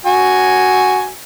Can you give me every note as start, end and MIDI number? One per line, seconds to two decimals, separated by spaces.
0.05 1.09 66
0.05 1.09 80